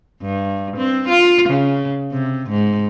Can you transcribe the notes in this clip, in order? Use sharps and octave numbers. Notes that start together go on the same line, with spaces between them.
G2
C4
F4
C#3
C3
G#2